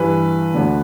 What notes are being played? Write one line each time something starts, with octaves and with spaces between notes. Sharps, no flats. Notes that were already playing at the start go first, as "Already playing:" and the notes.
Already playing: G2 E3 B4
D2 D3